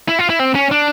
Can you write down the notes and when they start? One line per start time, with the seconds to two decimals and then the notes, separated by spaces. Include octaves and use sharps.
0.08 E4
0.19 F4
0.30 E4
0.39 C4
0.55 C#4
0.71 D4